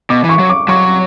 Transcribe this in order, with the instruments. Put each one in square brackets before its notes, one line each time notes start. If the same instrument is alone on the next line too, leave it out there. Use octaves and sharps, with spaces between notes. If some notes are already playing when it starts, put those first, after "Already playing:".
[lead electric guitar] B2 [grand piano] D6
[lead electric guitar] E3
[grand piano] C#6
[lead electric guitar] F#3
[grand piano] D6
[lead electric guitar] F#3 [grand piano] C#6